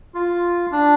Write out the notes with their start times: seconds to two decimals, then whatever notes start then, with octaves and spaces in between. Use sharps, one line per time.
0.14 F4
0.72 D4